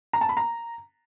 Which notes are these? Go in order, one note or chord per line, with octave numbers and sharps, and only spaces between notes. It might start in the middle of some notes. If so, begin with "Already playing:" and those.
A#5
A5
B5
A#5